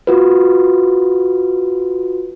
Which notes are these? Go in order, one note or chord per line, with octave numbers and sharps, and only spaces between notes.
F4 F#4 B4